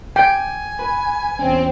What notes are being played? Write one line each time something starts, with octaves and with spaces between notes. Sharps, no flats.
G5 G#5
B4
E2 C4 C#4